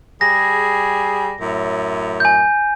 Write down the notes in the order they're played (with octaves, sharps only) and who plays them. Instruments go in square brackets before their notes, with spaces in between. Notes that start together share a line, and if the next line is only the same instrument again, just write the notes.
[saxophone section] G3 G#4 [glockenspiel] A#6
[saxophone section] F#2 A2
[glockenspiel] G#5 G6